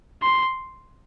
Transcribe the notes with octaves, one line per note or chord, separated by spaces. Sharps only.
C6